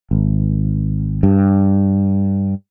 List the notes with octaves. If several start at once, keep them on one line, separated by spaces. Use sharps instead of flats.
G#1
G2